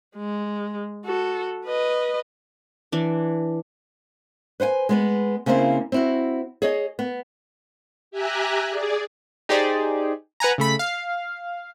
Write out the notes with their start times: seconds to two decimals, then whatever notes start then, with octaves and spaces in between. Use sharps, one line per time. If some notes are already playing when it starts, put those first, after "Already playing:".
0.17 G#3
1.06 F#4 A4
1.65 B4 D#5
2.92 E3 D4
4.60 B4 C5 F#5 G#5
4.89 G#3 B3 B4
5.46 C#3 A#3 C4 E4 C5
5.92 C4 E4 F#4
6.62 G#4 C#5 D#5
6.99 B3
8.11 G4 E5 G#5 A#5 F#6
8.70 G#4 D5
9.49 D#4 G4 G#4 C5 D5
10.40 B4 F#5 G#5 A#5
10.58 C#3 A3 B5 B6
10.79 F5